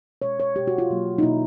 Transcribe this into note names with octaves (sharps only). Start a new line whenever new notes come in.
B2 G#3 C#5
C#5
B2 G#3 G4
F#4
F4
B2 F#3 A#3
D#4
B2 F#3 A#3 E4